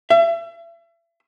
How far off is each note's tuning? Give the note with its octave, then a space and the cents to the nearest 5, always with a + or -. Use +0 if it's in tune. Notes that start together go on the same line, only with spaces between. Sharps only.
E5 +35